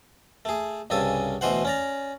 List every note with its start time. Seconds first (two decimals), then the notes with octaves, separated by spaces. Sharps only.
0.45 A3 G#4
0.90 C2 G2 C#3 A4 G#5 D#6
1.41 D2 B2 E3 C5 F#5
1.65 C#4 D5 A#5